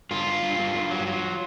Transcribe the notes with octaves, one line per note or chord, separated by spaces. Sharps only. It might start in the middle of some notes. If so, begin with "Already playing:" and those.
G2 F4
G2
G2
G2
G2
F#3
F#3